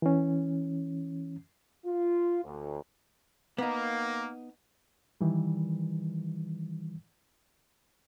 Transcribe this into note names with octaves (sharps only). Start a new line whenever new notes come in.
E3 C#4
F4
D2
A#3 B3 D#4
D#3 E3 G3